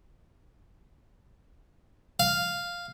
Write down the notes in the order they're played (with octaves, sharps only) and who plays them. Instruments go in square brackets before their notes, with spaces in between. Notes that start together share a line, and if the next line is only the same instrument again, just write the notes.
[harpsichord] F5